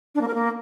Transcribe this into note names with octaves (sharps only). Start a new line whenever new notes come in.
D4
A#3
A#4
A#3